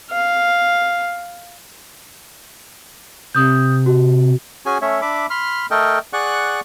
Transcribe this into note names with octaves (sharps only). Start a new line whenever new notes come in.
F5
C3 D#6 G6
F#4
C#4 F#4 G#4 G#5
A3 C#4 C#5 E5
D4 E5 B5 D6
B5 C6 F6
A3 A4 A#4 D#5 G5
G#4 D5 F#5 C#6 F#6